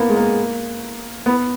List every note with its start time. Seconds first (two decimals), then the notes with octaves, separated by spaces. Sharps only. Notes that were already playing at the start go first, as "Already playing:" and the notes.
Already playing: A#3 B3
0.10 G#3
0.16 A#3
1.26 B3